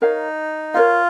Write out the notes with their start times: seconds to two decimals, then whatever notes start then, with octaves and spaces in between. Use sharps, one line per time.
0.02 D#4 A#4 C#5 F5
0.74 F4 A#4 C#5 F5